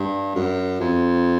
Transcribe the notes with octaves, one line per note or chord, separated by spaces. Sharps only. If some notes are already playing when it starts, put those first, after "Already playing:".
Already playing: G2
F#2
F2